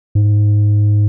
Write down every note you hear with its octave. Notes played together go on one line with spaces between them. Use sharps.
G#2